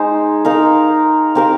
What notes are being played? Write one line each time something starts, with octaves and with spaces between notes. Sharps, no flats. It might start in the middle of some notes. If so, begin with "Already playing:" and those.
Already playing: G#3 D#4 G#4 C5
D#4 A#4 F5
C4 G4 A#4 F5